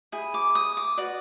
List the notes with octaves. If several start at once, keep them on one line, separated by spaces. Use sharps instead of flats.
E4 G#4
D6
D#6
D6
F#4 B4 D5 D6